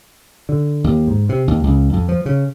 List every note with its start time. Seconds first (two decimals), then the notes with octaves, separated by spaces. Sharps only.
0.49 D3
0.84 D#2
1.07 G#2
1.29 C3
1.48 D#2
1.64 C#2
1.93 F2
2.09 F3
2.26 C#3